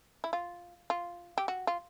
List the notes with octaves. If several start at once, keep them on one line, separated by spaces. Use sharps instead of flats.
E4
F4
F4
G4
F#4
F4